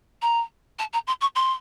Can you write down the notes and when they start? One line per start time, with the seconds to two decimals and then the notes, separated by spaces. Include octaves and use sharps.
0.22 A#5
0.79 A5
0.93 A#5
1.07 C6
1.21 C#6
1.36 C6